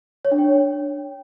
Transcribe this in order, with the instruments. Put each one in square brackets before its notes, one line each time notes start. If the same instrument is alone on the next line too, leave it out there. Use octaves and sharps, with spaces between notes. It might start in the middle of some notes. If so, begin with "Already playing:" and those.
[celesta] C#5
D4
G5